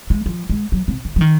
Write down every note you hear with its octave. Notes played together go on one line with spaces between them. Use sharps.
G#3
F3
G#3
F#3
C3
D#3
F3
D#3